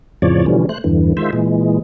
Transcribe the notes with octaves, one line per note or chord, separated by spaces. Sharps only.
F2 A2 C#3 F3 C#5 D5
B2 D3 E3 F3 G3 C#4
A3 C5 F#6
E2 G2 D3 E3
D#3 G#3 F4 C5 E5
A#2 E3 G#3